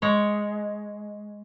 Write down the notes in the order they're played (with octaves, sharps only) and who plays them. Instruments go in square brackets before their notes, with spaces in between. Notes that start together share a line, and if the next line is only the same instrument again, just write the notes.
[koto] G#3 C#5